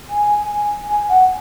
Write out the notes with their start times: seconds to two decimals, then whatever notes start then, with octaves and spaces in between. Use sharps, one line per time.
0.10 G#5
0.89 G#5
1.09 F#5